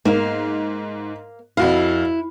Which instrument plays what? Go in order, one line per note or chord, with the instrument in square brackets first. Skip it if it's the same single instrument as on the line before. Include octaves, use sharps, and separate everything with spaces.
[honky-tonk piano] G#2 [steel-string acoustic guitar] A#3 F5
[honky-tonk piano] F2 F#4 F5 [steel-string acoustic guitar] E4